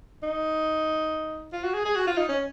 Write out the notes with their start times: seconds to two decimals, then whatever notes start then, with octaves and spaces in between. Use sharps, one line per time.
0.23 D#4
1.53 F4
1.63 F#4
1.74 G#4
1.85 G#4
1.95 F#4
2.07 F4
2.17 D#4
2.28 C#4